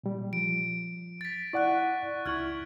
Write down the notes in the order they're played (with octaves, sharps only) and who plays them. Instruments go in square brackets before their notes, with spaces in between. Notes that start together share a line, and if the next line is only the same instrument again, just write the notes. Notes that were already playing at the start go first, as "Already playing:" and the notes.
[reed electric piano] A#2 G3
[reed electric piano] F3 [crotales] D7
[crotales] A6 B6
[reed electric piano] E4 D5 F#5 [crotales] C#6 F#6
[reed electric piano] C#2 E4 C#6 [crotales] F6 G#6 F#7